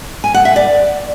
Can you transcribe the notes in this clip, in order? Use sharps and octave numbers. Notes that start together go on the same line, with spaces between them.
G#5
F#5
E5
D5